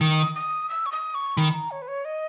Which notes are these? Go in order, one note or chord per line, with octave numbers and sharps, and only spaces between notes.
D#3 D#6
D#6
E6
C#6
D#6
C#6
D#3 B5
A#5
C#5
B4
C#5
D#5